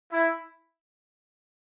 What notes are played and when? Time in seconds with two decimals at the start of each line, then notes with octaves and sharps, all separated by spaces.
0.11 E4